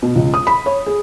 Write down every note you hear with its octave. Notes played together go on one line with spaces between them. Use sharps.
B2
C#2
D#6
B5
C#5
G#4